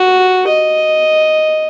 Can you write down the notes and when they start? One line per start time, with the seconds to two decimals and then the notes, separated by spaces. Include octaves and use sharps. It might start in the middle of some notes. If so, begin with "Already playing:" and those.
Already playing: F#4
0.48 D#5